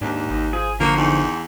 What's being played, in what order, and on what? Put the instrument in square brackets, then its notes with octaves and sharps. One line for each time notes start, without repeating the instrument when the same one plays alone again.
[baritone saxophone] D#2 [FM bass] G#2 [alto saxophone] D4
[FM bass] G#1 [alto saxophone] D#4
[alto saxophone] F3 [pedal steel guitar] G#4
[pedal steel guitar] D3 F3 F#4 [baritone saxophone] A#3 [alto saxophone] F4
[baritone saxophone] E2 [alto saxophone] D#3